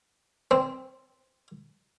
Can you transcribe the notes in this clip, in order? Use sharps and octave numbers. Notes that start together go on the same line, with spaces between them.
C4